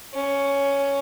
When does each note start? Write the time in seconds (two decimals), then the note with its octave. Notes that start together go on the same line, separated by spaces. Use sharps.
0.14 C#4